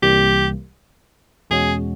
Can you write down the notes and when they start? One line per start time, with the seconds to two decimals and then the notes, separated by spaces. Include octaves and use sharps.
0.02 C2 C3 E3 G3 A#3 G4
1.50 E2 B2 G#3 C#4 F#4 G#4